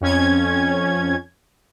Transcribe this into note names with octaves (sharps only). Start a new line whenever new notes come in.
F2 C#4 G#6